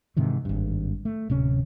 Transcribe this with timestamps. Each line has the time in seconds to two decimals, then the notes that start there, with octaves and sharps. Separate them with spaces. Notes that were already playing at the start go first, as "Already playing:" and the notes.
0.17 G#2 C3 D#3 E3
0.45 G#1 G2
1.05 A3
1.30 D1 C3 C#4